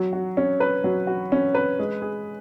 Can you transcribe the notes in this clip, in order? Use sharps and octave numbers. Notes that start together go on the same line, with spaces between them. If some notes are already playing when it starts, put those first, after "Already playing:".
Already playing: F#3
F#4
C#4
B4
F#3
F#4
C#4
B4
G#3
G#4